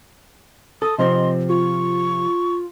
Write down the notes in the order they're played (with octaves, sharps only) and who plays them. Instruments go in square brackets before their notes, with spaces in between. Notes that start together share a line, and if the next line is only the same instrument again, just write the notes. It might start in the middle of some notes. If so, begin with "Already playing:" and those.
[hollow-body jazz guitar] A4 [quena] D#6
[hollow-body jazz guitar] C3 F3 C4 [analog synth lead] D#5 [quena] C6
[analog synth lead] F4 [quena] C#6